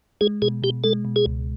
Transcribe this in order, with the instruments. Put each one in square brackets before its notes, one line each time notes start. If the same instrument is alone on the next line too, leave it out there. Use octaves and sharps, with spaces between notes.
[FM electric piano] G#3 [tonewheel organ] G#4
[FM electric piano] B2 [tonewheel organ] G#4
[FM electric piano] B2 [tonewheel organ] G4
[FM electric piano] G#3 [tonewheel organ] A4
[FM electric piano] B2
[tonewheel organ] G#4
[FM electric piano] C#2